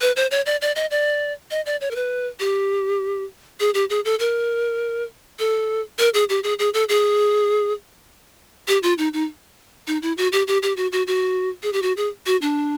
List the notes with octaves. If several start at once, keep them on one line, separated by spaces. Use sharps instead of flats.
B4
C5
C#5
D5
D5
D#5
D5
D#5
D5
C#5
A#4
B4
G4
G#4
G4
G#4
A4
A#4
A4
A#4
G#4
G4
G#4
G#4
A4
G#4
G4
F4
D#4
D#4
D#4
E4
F#4
G4
G4
G4
F#4
F#4
F#4
G#4
G4
F#4
G#4
F#4
D4